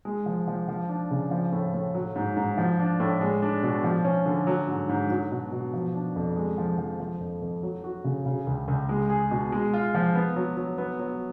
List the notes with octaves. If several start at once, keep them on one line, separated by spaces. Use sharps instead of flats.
G#3
F3
F3
F3
D4
C#3
F3
A2
A2
F#3
G#2
G#2
F3
D4
A2
G#3
D4
B2
F3
C#4
D3
F#3
G#2
G#2
F#3
B2
B2
F3
D4
F2
G#3
F3
F3
F3
F2
F2
F#3
F#4
C#3
C#3
C#2
C#2
G#3
G#4
B2
G#3
F4
F3
B3
F#3
F#3
B3
F#3